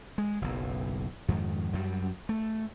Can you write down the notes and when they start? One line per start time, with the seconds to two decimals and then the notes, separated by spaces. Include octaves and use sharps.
0.18 G#3
0.42 F#1 B1
1.29 F2 G#2 D#3
1.74 F#2 F#3 G3
2.29 A3